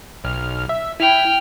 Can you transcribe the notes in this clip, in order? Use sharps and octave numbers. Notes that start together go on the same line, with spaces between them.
B1 F6
E5
E4 G5 F6